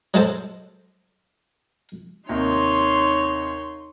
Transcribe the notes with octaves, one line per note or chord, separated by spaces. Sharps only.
F#3 G#3 A4 C5
D#2 C3 D#4 C#5 C6